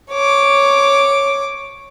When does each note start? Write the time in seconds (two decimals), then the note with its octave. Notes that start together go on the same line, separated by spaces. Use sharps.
0.12 C#5 D6